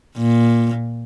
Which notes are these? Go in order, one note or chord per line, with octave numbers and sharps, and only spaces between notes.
A#2